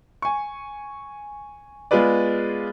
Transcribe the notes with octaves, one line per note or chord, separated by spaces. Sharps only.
G#5 C#6
G#3 B3 F4 G#4 B4 D5